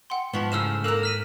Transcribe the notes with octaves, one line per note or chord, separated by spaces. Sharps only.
F#5 G5 C6
G#2 F3 B3 A5 C#6 G7
F#2 A2 C#3 E6 F6 E7
A#3 A4 A#4 E6 F#6 E7
F6 B6 D#7